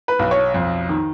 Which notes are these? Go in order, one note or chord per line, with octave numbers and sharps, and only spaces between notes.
B4
B1
C#5
F2
D#3